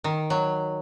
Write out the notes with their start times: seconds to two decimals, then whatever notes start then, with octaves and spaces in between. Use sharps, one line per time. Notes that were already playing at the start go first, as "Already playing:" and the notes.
0.04 D#3
0.30 F#3